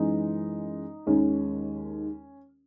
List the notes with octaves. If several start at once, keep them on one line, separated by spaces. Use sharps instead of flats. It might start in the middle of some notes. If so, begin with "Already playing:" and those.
Already playing: F#2 E3 G#3 D#4
D#2 D#3 G#3 C#4